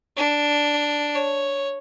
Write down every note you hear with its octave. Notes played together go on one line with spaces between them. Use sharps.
D4
C#5